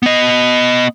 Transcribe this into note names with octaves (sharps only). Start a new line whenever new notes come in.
B3 D#5